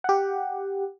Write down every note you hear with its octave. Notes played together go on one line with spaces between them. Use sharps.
G4 F#5